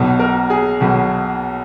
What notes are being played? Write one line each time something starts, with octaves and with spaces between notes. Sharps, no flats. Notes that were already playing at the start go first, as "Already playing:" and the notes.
Already playing: B1 B2
A#4
G#4
B1 B2